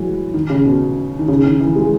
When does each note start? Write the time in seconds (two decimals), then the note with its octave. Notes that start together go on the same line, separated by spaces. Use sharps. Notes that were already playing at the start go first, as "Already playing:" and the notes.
Already playing: E3 F#3 G#3
0.34 D#3
0.50 C#3
0.66 B2
1.19 D#3
1.28 C#3
1.44 D#3
1.60 E3
1.76 G#3